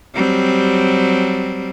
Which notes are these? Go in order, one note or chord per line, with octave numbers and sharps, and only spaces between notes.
F#3 G3 C4